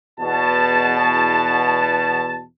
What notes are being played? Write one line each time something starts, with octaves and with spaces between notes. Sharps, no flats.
E2 B2 A5